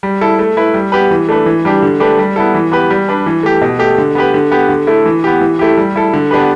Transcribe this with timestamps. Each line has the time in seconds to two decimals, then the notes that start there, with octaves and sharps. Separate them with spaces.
0.03 G3
0.21 E4 A4
0.39 A3
0.57 E4 B4
0.74 G3
0.92 B3 G4 B4
1.11 E3
1.29 A3 D4 B4
1.46 E3
1.65 G3 D4 G4
1.82 D3
2.00 A3 D4 G4 B4
2.19 G3
2.36 B3 E4 A4
2.54 E3
2.71 B3 G4 B4
2.90 G3
3.09 D4 B4
3.26 E3
3.43 A3 G4
3.62 B2
3.79 A3 G4
3.98 D3
4.15 B3 G4 B4
4.34 D3
4.52 B3 G4
4.69 D3
4.87 A3 E4
5.05 E3
5.24 B3 G4
5.41 E3
5.59 A3 E4 G4
5.77 G3
5.96 E4 A4
6.13 D3
6.31 B3 D4 G4 B4